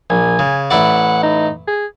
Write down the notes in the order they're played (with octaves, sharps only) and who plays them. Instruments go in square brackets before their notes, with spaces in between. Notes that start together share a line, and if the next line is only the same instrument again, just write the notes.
[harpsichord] A#1 [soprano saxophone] G#5
[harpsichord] C#3
[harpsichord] A1 E4 D5 [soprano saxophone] F#5
[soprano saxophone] D#4
G#4